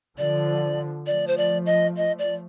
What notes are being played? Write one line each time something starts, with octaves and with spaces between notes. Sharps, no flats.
D3 F3 D5
F3 A3 D5
C5
D5
D#5
D#5
D5